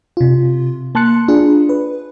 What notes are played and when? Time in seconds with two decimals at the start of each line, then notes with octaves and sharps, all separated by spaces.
0.17 C3 F4
0.95 A#3 A5 C6 F#6 C#7
1.28 D4 F4 G#4
1.69 B4